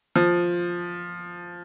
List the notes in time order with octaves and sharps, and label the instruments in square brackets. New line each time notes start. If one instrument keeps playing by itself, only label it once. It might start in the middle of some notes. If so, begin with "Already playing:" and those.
[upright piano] F3